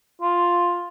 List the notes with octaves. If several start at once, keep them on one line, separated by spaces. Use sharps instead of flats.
F4